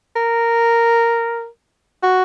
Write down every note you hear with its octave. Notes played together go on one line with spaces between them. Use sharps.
A#4
F#4